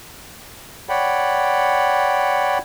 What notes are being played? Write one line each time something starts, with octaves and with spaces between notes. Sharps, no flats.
C#5 D5 F#5 G5 B5